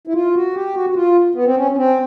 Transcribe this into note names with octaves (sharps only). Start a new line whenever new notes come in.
E4
F4
F#4
G4
F#4
F#4
F4
B3
C4
C#4
C#4
C4